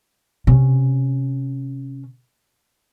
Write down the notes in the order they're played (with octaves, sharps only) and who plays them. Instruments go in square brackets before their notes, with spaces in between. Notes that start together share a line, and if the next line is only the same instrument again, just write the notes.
[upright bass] C3 C#4